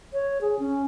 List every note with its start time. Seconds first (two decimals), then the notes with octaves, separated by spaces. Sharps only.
0.13 C#5
0.41 G#4
0.59 C#4